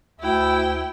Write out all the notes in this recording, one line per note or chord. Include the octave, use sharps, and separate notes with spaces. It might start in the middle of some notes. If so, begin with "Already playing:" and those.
D2 E4 G5